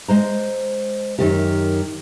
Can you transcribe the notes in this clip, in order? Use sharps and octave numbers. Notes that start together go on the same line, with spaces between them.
G#3 C5 A#5
F#2 D#3 G4